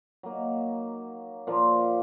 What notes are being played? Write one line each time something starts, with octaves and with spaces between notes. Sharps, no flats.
F#3 A#3 D#4
A#2 F3 A#3 F4